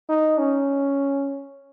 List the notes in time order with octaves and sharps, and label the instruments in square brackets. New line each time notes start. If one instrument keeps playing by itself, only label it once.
[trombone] D#4
C#4